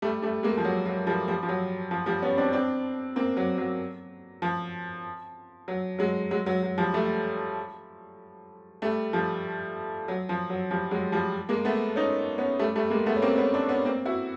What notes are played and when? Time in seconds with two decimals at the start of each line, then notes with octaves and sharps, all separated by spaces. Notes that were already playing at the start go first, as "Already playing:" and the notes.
0.02 G3 A3
0.22 G3 A3
0.43 G#3 A#3
0.57 F3
0.65 F#3
0.86 F#3
1.07 F3 G3
1.28 F3 G3
1.43 F3
1.49 F#3
1.91 F3
2.06 F3 G3
2.22 B3 C#4
2.37 C4 D4
2.53 C4 D4
3.16 A#3 C4
3.37 F#3
3.58 F#3
4.42 F3
5.68 F#3
5.99 F#3 G#3
6.31 F#3 G#3
6.46 F#3
6.63 F#3
6.78 F3 G3
6.94 G3 A3
8.82 G3 A3
9.13 F3 G3
10.08 F#3
10.29 F3
10.50 F#3
10.71 F3 G3
10.91 F#3 G#3
11.12 F3 G3
11.49 G#3 A#3
11.65 A3 B3
11.96 C#4 D#4
12.38 B3 C#4
12.59 G3 A3
12.75 G3 A3
12.90 G#3 A#3
13.06 A3 B3
13.16 C#4
13.22 A#3 C4
13.38 B3 C#4
13.53 C4 D4
13.69 B3 C#4
13.85 A#3 C4
14.06 E4 F#4